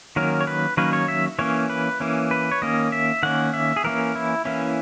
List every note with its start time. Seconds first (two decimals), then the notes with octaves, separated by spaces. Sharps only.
0.16 D#3 F#3 A#3 C#4 A#4
0.41 C#5
0.47 B4
0.77 D#3 F#3 A#3 C#4 B4
0.93 C#5
1.08 E5
1.39 E3 A#3 C#4 C#5
1.70 B4
2.00 E3 A#3 C#4
2.31 B4
2.52 C#5
2.62 D#3 A#3 C#4 D#5
2.92 E5
3.23 D#3 A#3 C#4 F#5
3.54 E5
3.76 G#4
3.84 E3 A#3 C#4 A#4
4.15 E4
4.45 E3 A#3 C#4 E4